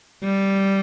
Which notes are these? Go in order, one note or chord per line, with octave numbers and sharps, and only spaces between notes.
G3